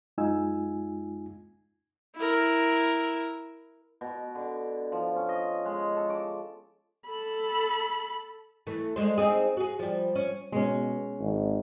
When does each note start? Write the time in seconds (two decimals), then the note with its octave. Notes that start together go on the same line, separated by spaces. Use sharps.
0.18 F#2 G#3 D#4 F4 G#5 E6
2.17 E4 A#4
4.01 B2
4.35 D3
4.92 F3
5.16 C#4
5.29 D#5
5.66 G#3
5.96 A4
6.10 D6
7.09 A4 B5
8.67 E3 A3
8.96 D3 G#3 C5
9.18 C4 D#4 G#4
9.57 F#4 G#4
9.79 F3 G3
10.15 C#4
10.52 B2 G#3 C#4
11.20 G#1